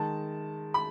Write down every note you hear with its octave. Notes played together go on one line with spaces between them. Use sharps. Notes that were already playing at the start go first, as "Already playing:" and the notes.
Already playing: D#3 G#3 A5
B5